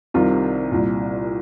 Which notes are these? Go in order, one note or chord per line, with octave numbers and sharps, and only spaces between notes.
C2 C3 D#3 F4
C2 A#2